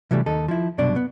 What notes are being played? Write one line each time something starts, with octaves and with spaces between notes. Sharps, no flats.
C3 E3 F#3 G3 A3
D#2 D#4 A4
F3 E4
C2 F#2 B2 D4 D5
B3